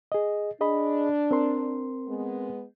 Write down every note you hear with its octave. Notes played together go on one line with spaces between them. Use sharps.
G#4 D#5
D4 G#4 D#5 B5
C4 A#4 C6
G#3 B3